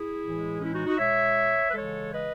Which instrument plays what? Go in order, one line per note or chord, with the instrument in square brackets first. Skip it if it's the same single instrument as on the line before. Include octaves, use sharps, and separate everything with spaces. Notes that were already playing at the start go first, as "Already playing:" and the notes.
Already playing: [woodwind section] E4 G#4
A2 E3 G#3
C#4 E4
D#4 F#4
D#4 F#4
B2 G#3 C#5 E5
B4
C#3 E3 G#3 A4 C#5
B4 D#5